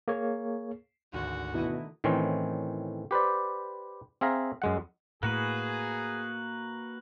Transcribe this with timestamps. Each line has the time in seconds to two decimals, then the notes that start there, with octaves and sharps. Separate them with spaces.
0.08 A#3 G#4 C#5
1.13 G#1 D2 F#4
1.54 B2 D#3 A3 E4 D#5
2.04 A2 D#3 E3 C4 C#4
3.11 G4 B4 C5 D5
4.21 C4 G#4 E5 F5 A#5
4.62 F#2 G#3 F#5
5.23 A2 A#3 F#4 G#4 B4 F#6 F#7